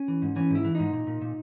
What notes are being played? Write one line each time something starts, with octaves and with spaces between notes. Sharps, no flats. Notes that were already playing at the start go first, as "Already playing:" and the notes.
Already playing: C#4
E3
G#2
E3 C#4
G#2 E4
E3
G#2 D#4
A#2
A#2
A#2